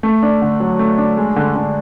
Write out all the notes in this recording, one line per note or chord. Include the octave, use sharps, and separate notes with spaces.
A3
D4
D3
F#3
A3
D4
G#3
D3
D3